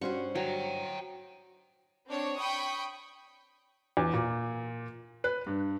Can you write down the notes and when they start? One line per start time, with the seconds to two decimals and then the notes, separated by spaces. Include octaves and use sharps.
0.01 G2 G3 C#4 F#4 C5 C#6
0.35 F#3 G5 A#5
2.08 C4 D4 C#5
2.37 G5 B5 C#6 D#6
3.97 E2
4.13 A#2
5.24 B4
5.46 G2